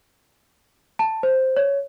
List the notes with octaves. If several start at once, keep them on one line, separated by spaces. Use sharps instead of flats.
A5
C5
C#5